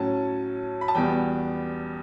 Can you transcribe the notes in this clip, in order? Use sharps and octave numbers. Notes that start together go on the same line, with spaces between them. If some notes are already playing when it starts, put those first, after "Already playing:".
Already playing: A2 F#3 C#4 A5
B5
A5
E2 B2 G3 B3 G5